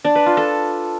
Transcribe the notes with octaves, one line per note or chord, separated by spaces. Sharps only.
D4
B4
F4
A4